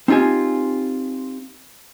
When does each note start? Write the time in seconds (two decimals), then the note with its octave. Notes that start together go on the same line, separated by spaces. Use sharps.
0.08 C4 D#4 F4 G4 G#5